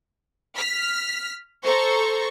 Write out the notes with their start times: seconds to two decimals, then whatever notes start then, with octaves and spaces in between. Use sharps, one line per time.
0.56 F6 B6
1.63 A4 C5 A#5 C#6